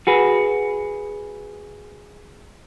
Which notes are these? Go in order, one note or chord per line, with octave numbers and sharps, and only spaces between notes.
F#4 G#4 B4